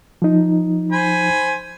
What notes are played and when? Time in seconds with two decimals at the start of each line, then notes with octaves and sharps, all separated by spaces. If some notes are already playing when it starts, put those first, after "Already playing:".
0.22 F3 D#4
0.92 C5 G#5 B5